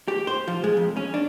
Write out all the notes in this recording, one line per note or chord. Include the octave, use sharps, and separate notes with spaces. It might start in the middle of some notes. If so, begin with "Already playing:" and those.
G4
C5
F3
G#3
F2
C#4
D4